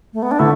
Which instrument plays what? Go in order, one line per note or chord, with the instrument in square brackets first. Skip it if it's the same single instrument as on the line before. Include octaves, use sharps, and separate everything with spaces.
[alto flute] A3
B3
D4
[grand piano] D3 A3 [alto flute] E4